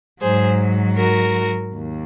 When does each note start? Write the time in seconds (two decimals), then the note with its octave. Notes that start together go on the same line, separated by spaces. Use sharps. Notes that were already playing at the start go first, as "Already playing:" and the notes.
0.21 G#2 F#3 G#4 C5
0.98 F#4 A#4
1.76 D#2